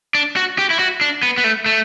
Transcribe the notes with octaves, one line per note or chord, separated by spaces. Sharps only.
D4
F#4
G4
E4
F#4
D4
B3
B3
A3
A3